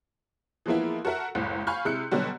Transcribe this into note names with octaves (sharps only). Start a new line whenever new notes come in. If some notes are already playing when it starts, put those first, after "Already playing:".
E3 F3 G#3 A#3 B3 E4
F#4 A4 A#4 E5 F#5
F#1 C#2 A2
F5 G#5 B5 C#6 F6 G6
C3 G#3 E4 F#6 G6 C#7
B2 D3 F#3 G3 F#4